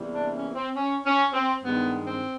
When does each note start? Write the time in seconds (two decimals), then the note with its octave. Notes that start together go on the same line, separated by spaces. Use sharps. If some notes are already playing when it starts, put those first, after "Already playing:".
Already playing: E2 C3 E3 G3 A#3
0.13 D4
0.34 C#4
0.54 C4
0.76 C#4
1.06 C#4
1.33 C4
1.62 G2 D#3 G#3 B3
2.05 C4